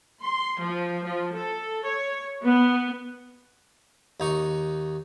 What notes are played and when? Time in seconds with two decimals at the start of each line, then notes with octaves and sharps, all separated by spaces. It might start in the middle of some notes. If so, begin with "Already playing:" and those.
0.22 C6
0.60 F3
1.04 F3
1.35 A4
1.84 C#5
2.44 B3
4.20 D#2 D#4 C#6